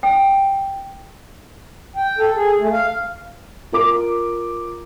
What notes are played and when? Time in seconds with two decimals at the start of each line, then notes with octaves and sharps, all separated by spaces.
0.03 G5
1.96 G5
2.18 A4
2.36 G#4
2.59 A3
2.72 F5
3.72 F4 A#4 D6